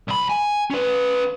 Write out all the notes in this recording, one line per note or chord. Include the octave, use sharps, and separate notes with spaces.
C2 B5
G#5
C#4 B4